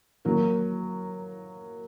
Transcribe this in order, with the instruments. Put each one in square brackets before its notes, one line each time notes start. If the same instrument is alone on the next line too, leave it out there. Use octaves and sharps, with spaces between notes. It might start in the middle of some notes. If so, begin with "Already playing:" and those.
[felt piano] F#3 A#3